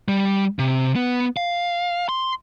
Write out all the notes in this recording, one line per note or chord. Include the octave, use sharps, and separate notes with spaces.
G3
C3
B3
F5
C6